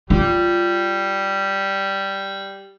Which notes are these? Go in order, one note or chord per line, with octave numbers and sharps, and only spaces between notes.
G3 F4